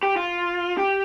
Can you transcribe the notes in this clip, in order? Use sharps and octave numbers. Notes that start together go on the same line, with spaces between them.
G4
F4
G4